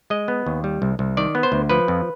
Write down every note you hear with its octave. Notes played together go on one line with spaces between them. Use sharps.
G#3 D#5
B3
D#2
G3
C2
C2
D#3 D5
B3
C5
D2
F3 B4
F2